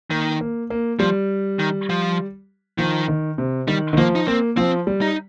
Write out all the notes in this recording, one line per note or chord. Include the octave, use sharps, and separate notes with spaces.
D#3 A#3
A#3
A#3
F3 G3
D#3
F3
D#3 F3
D#3
C3
D#3 G3
D#3
F3 A#3
D#4
A#3 C4
F3 C4
G3
D#4